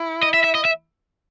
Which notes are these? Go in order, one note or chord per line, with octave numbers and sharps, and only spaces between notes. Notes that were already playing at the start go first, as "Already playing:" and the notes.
Already playing: E4
D#5
E5
E5
D#5
E5